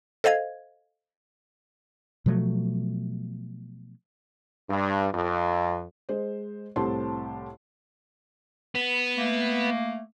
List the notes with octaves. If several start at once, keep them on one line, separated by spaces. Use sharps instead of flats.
A4 C5 D#5 F5 G#6
B2 F3 F#3 A3
G2
F2
G#3 C5
C2 A2 C4 G4 A5 C6
B3
A3 A#3